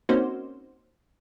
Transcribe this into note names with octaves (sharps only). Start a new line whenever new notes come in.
A#3 C4 C#4 D#4 F#4 C5